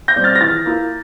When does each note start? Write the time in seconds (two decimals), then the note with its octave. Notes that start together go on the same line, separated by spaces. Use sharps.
0.08 G6 A#6
0.16 G3 C4
0.24 F6 A6
0.35 A#6
0.41 E3 F6 A6
0.66 A#3 E4